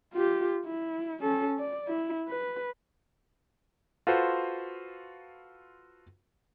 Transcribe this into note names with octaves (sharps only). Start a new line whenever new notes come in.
F4 G4
E4
C#4 A4
D5
E4
B4
F4 F#4 A4 B4 C5